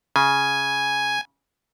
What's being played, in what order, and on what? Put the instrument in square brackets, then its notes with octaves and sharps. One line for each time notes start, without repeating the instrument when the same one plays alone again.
[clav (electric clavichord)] C#3 [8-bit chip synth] G#5